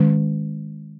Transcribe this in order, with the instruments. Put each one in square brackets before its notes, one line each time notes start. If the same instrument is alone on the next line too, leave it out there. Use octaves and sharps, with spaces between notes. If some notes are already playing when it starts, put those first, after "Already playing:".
Already playing: [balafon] D#3 G#3 C#4